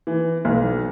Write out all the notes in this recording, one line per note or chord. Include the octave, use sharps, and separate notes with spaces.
E3
B1